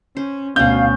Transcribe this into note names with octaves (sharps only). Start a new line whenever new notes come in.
C#4 C5
D2 B2 B3 C#4 F5 G6